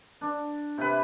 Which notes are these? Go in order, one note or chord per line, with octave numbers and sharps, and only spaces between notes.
D4
C3 B4